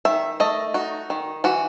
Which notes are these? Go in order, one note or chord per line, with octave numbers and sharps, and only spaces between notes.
D#3 E5
A3 D#5
D#4 F#4
D#3
E3 F#4